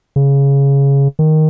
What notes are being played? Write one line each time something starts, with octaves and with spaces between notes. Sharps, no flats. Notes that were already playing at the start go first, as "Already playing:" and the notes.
C#3
D#3